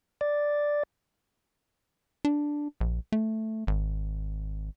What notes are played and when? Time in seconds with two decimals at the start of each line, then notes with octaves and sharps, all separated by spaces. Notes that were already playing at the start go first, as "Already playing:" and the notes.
0.21 D5
2.25 D4
2.81 A#1
3.12 A3
3.67 G#1